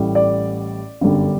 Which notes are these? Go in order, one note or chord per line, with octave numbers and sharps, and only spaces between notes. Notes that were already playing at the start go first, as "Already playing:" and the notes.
Already playing: A1 A2 G3
D5
G1 F#2 D3 G3